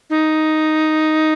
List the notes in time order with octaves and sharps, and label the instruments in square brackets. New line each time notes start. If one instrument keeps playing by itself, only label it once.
[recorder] D#4